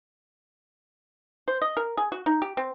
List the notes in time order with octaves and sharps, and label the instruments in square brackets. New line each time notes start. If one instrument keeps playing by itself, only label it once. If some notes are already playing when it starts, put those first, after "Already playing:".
[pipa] C5
D#5
A#4
G#4
F#4
D#4
G4
C4